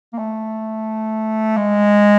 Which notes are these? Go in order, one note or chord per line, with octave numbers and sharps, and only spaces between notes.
A#3
A3
G#3